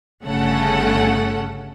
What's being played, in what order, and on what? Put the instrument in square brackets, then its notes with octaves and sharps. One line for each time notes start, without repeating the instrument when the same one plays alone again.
[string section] G1 C#3 A3 C#4 A4 F#5